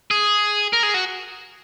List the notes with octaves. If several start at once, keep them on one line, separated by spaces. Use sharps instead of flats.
G#4
A#4
G#4
F#4